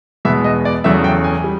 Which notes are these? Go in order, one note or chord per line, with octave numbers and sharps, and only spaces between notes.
E2 B2 G#3 B3 E5
D#5
D5
E2 C#3 F#3 A3 E5
G5
G#5
G3